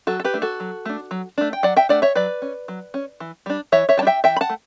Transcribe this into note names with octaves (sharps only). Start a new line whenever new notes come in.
F#3 F#4 A4
A4
G4 B4
A3 D4
F#4 A4
F#3
A3 D4
F#3
A3 D4
G5
F#3 D5 F#5
E5 G5
A3 D4 D5 F#5
C#5 E5
F#3 B4 D5
C#4
F#3
C#4
E3
G3 D4
E3 C#5 E5
C#5 E5
G3 A5
D4
E5 G5
E3 E5 G5
B5
F#5 A5
A3